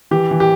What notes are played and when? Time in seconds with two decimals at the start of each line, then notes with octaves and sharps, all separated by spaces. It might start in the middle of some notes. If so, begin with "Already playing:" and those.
0.11 E3 G4
0.31 E3
0.40 G4